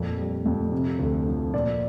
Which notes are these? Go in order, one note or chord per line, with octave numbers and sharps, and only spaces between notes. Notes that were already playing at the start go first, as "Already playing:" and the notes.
Already playing: F2 A#2
G3
F2
C3
D2
F3
A#2 D5